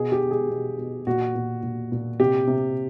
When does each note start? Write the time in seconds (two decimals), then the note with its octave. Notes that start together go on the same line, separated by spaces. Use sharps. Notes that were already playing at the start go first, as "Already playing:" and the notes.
Already playing: B2 G#4
0.12 G4
0.22 B2
0.31 G#4
0.50 B2
0.78 B2
1.07 A#2 F#4
1.35 A#2
1.63 A#2
1.92 A#2
2.20 C3 G4
2.47 C3